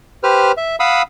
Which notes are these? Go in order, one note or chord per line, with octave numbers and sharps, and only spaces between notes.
G4 B4 C5 F6
E5
F5 F#5 B5 D#6 E6